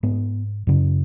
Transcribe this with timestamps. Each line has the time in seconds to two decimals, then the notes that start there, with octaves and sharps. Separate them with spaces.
0.03 G#2 B3
0.67 F#2 C#3